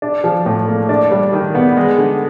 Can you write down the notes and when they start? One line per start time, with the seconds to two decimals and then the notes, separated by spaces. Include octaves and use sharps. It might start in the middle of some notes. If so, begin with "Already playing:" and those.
0.02 D4
0.24 F3
0.46 A2
0.68 A#3
0.89 D4
1.11 G3
1.33 D#3
1.55 B3
1.77 G#3
1.98 D3